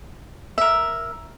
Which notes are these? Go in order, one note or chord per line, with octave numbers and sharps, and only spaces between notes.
A#4 E5